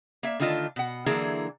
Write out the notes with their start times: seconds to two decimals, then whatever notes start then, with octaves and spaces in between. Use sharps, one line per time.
0.23 A#3 E5
0.40 D3 D#3 A3 F4 D#5 A5
0.76 B2 F#5
1.06 D3 E3 F#3 A#3 E4 G#4